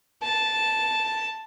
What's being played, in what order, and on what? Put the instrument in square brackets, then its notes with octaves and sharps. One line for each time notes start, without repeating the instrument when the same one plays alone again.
[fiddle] A5